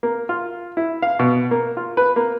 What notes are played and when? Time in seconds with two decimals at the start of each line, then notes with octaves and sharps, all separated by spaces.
0.03 A#3
0.29 F4
0.77 E4
1.02 F5
1.19 B2
1.51 A#3
1.77 F4
1.97 B4
2.16 A#3